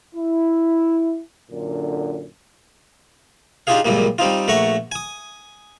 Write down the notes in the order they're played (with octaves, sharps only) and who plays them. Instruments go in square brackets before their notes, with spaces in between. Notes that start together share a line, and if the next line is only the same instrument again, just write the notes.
[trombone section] E4
F#2 A#2 D3
[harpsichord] D4 D#4 F4 G4 G#4 F5
C#2 F#2 A#2 G3 A#3
G3 C4 D#4 F4
A#1 A3 F#5 A#5 C#6
G#5 D#6